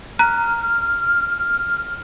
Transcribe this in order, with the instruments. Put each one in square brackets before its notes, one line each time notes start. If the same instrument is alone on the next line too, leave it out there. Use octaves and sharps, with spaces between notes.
[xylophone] A#5 F#6 [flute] F6